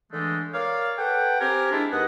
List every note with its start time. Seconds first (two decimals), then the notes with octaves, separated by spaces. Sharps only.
0.12 D3 E3 G#3 A3
0.54 A#4 C#5 D5 F5
0.98 A4 B4 F#5 G5
1.41 C4 G4 A#4 G#5
1.72 G#3 D4 E4 F4
1.92 D#2 B4 D#5 F#5